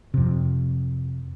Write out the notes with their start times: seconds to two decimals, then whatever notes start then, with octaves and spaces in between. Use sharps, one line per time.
0.14 F2 C3